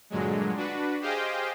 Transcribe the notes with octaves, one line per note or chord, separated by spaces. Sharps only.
G2 A#2 D3 F#3 G#3
D4 F#4 B4
G4 G#4 C5 D#5 F5 G5